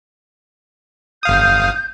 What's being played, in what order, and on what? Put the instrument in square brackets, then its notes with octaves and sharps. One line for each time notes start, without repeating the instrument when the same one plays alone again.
[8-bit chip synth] G1 F5 D#6 [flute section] G6